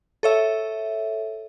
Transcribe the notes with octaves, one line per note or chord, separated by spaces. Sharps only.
A4 C#5 E5